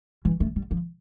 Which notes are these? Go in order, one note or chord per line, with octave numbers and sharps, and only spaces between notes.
E3
A3
G3
F3